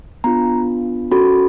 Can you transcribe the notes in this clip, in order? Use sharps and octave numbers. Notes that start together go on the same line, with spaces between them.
B3 D4 F4 A#5
C#4 F#4 A4 B5